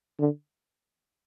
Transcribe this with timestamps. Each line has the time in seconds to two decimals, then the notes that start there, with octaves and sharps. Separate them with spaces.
0.19 D3